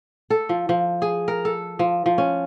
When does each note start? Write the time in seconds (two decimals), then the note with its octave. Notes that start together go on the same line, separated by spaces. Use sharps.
0.30 A4
0.49 F3
0.69 F3
1.02 G#4
1.28 A#4
1.45 A4
1.79 F3
2.06 F3
2.18 C#4